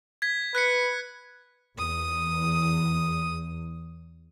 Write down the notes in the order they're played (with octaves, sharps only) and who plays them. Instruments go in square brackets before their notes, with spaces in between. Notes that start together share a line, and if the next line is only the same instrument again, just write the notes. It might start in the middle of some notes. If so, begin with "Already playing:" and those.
[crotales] G#6 B6
[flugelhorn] B4 [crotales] F#6 B6 C#7
[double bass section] E2 [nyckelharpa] D#6